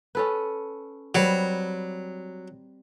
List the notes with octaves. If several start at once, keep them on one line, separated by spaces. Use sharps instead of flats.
C#4 A4 B4
F#3 G3 C4 B4